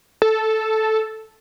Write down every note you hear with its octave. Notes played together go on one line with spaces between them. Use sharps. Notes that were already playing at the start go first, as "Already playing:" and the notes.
A4